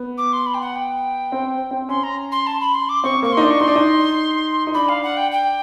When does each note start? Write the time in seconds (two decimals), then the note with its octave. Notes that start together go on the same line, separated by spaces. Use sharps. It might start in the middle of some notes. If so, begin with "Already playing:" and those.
Already playing: B3
0.18 D6
0.33 C6
0.46 B5
0.54 G5
0.61 F#5
0.76 G5
1.32 C4
1.71 C4
1.89 C#4 C6
2.03 A#5
2.32 C6
2.47 A5
2.61 B5
2.74 C6
2.89 D6
3.04 C4 C#6
3.23 A#3 C#6
3.32 D#4 C6
3.41 D4
3.50 C#6
3.60 D#4 C6
3.68 D4
3.75 D#4
4.67 D#4
4.74 D4 B5
4.89 F5
5.03 F#5
5.17 G5
5.32 G5